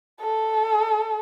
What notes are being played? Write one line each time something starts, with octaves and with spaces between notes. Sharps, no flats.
A4